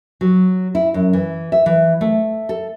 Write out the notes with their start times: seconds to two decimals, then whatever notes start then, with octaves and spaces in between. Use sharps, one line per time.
0.21 F#3
0.75 E4
0.94 F#2
1.13 E3
1.52 E5
1.66 E3
2.01 A3
2.49 A4